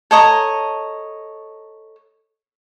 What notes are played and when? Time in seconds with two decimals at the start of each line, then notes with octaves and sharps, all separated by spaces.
0.11 A4 C#5 D#5 A#5